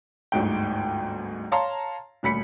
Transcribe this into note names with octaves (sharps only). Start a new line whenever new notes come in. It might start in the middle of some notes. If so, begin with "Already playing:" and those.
G1 D2 G#2 G5
C#5 F5 A5 A#5 C6
D#1 D2 B5 B6 C#7